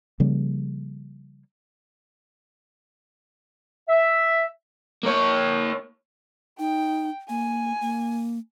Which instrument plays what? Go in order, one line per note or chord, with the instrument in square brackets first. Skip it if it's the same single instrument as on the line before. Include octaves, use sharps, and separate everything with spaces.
[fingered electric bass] C#3 F3 G3 A#3
[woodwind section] E5
[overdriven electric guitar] A#3 C#5
[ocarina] D#4 [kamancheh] G5
[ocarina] A#3 [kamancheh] G#5
[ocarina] A#3